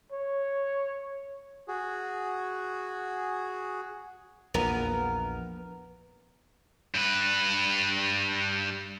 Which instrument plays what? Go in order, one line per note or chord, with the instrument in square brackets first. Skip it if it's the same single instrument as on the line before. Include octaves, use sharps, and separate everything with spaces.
[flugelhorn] C#5
[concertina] F#4 G#4
[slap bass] A#1 E2 [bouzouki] B3 A#4
[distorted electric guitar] G2 B4